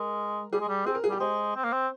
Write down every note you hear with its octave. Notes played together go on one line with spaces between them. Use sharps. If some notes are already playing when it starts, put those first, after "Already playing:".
Already playing: G#3 A#4
G3 G#4
G#3
G3
C4 G#4
A#4
G#4
G3 G4
G#3 C5
C4
A#3
C4